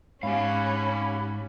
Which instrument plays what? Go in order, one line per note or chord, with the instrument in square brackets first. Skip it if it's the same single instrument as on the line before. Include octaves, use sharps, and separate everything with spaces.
[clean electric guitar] G#2 [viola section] C#4 [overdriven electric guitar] G4 F5 [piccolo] B5